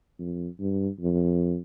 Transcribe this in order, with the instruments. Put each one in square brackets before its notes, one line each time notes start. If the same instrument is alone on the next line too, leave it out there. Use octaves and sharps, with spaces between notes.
[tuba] F2
G2
F2